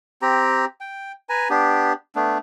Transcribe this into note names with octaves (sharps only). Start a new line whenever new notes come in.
C4 G4 A#5
G5
B4 G#5 A#5
B3 D4 G4
A3 B3 D4